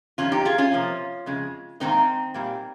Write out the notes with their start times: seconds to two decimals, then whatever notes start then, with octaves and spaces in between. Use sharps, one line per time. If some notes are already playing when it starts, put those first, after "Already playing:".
0.18 F2 D#3 G3 C#4 F4
0.32 D#4 G4
0.45 F4 G#4
0.58 C#4 F4
0.72 C3 F3 A#3
1.26 F2 C#3 G#3
1.80 G#2 D#3 G3 A#3 C4 D#4
2.34 A#2 G3 A#3